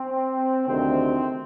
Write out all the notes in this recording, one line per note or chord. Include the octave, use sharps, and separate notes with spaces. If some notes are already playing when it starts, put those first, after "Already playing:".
Already playing: C4
D2 C3 D#3 C4